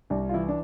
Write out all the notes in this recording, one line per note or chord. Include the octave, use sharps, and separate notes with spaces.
C2 D4
F4
E3 E4
D4